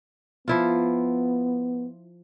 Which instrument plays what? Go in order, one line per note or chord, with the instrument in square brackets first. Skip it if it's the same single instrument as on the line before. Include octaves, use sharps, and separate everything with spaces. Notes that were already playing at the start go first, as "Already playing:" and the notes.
[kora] F3 E4 F4 [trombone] B3